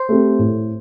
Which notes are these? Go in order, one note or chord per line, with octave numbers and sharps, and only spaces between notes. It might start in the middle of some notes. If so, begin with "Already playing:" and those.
Already playing: C5
A3 C4 G4
A2